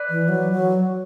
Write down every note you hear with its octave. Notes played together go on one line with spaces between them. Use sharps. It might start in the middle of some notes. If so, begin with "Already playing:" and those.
Already playing: B4 D5
E3
F#3
F#3